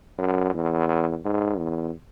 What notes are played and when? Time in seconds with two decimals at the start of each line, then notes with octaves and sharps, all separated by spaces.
0.18 F#2
0.54 E2
1.25 G#2
1.59 E2